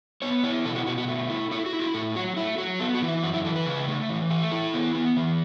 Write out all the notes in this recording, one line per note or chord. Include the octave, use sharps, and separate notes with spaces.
B3 C#5
E4 C#5
B2 A4
F#4
B2 F#4
F#4
A3
E4
E4 A4
F#4
E4
F#4
A2 A4
F#3 F#4
A3 E4
F#3 F#4
B3 A4
F#4
E3
E4
F#2 F#4
E4
E3 A4
B4
C#3
A3
E3
A3
E4 A4
B3
B3
E3